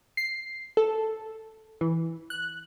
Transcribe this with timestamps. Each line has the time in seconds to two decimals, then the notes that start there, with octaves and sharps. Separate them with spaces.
0.17 C7
0.77 A4
1.81 E3
2.30 F#6